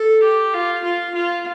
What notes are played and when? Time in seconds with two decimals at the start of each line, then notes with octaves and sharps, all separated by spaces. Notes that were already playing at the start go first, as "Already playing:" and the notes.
Already playing: A4
0.23 G4
0.54 F4
0.84 F4
1.15 F4